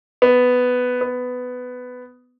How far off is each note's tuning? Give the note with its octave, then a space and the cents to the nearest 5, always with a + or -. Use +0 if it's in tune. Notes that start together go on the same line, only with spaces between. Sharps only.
B3 +10
B3 +15